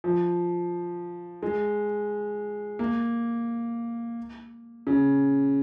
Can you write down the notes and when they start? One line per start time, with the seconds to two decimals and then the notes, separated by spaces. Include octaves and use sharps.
0.04 F3
1.43 G#3
2.79 A#3
4.87 C#3